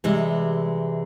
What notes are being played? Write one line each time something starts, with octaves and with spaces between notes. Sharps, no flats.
C3 E3 G3 G#3